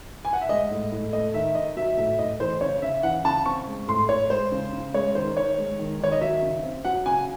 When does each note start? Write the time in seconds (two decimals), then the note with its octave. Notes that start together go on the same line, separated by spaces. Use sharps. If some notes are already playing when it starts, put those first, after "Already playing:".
0.25 G#5
0.33 F#5
0.41 E5
0.49 G#3 D#5
0.71 A2
0.92 A2
1.13 A3 D#5
1.34 D#3 E5
1.55 D#3 D#5
1.76 F#3 E5
1.98 A2 E5
2.19 A2 D#5
2.40 E3 C5
2.61 C#3 C#5
2.82 C#3 E5
3.03 E3 F#5
3.25 C#3 A5
3.46 C4 C#6
3.67 G#3
3.88 A2 C6
4.09 A2 C#5
4.30 G#3 C5
4.52 C#3
4.73 C#3
4.94 G#3 C#5
5.15 D#3 C5
5.36 D#3 C#5
5.58 G#3
5.79 D#3
6.00 D#3 C#5
6.12 D#5
6.21 F#3 E5
6.42 C#3
6.63 C4
6.85 F#3 F#5
7.06 C#3 G#5